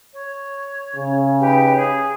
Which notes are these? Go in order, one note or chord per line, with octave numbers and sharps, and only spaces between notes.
C#5
C#3
D#4 G4 B4
G#4